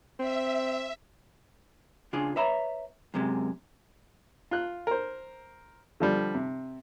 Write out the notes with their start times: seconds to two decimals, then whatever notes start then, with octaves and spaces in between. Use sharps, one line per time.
0.19 C4 E5
2.13 C#3 D4 F4 G#4
2.36 B4 C#5 E5 A#5 B5
3.14 F#2 C3 G#3
4.51 F4 F#6
4.87 A#4 C5
6.00 D3 F3 G3
6.35 C3